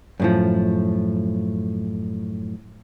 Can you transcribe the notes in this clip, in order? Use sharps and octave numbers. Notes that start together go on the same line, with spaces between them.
F#2 A2 F3